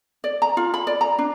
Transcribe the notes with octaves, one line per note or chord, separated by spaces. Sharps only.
D5
A#5
F4
B5
D5
A#5
D4